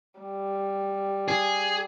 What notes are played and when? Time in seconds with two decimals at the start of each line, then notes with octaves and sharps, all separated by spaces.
0.20 G3
1.28 G#4